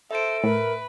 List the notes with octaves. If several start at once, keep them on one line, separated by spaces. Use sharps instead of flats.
A4 C5 E5 D7
A2 A#4 B4